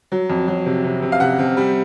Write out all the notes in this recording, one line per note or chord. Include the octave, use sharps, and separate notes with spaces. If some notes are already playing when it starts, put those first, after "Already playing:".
F#3
F2
F#3
C3
C3
C3
F5
C3 F#5
C3
G3